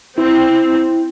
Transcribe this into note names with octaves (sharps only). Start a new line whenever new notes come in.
C4 E4